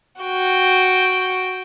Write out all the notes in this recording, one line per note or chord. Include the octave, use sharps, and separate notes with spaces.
F#4 G5